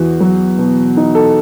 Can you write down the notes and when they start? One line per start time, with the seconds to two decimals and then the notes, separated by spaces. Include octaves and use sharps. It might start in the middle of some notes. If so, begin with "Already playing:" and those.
Already playing: E2 E3 F#4
0.20 F#3
0.58 B2
0.97 D#4
1.15 A4